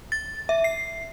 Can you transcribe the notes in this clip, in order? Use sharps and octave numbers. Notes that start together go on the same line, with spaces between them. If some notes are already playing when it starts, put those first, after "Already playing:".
A6
E5
C7